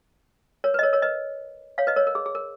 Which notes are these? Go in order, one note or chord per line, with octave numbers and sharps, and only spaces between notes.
A#4 C#5
B4
D#5
A#4 C#5
A#4 C#5
B4 D#5
C#5 F5
B4 D#5
A#4 C#5
A#4
G#4
G#4
A#4